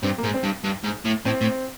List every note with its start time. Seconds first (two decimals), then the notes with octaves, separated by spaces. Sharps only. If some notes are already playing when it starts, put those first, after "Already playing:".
0.03 G2 C4
0.18 A#3
0.24 G#2
0.34 C4
0.43 G2
0.64 G2
0.84 G#2
1.05 A2
1.25 A2 C4
1.41 A2